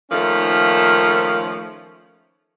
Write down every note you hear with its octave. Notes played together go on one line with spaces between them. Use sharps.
D#3 F3 A3 A#3 C#4